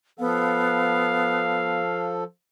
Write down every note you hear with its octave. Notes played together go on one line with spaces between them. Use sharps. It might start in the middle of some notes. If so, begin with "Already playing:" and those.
F3 B3 A4 F5